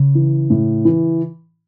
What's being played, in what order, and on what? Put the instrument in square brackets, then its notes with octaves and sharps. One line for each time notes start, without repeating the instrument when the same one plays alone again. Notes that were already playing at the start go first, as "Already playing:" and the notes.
Already playing: [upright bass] C#3
[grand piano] E3
A2
E3